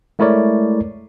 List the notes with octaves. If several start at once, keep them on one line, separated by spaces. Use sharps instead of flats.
G#3 A3 E4 A#4 C#5 D5